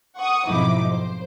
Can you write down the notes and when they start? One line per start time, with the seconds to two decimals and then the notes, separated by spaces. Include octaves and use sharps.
0.17 F#5 C#6 D#6
0.46 B1 F2 G#2 D#4 E4 D6
0.87 C5